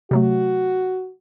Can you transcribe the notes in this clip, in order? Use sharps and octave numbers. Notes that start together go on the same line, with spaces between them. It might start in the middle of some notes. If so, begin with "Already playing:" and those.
C3 F#3 A3 F#4